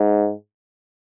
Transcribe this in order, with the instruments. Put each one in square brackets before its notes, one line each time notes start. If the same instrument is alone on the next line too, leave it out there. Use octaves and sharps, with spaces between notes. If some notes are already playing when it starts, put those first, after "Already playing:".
Already playing: [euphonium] G#2